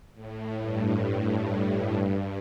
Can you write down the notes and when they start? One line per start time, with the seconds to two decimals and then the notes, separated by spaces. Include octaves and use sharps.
0.14 A2
0.58 G2
1.47 A2
1.91 G2